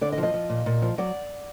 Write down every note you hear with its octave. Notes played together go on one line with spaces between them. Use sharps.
D3 D5
D#5
F3
D#5
F3
A#2
A#2
F3
F#3 D5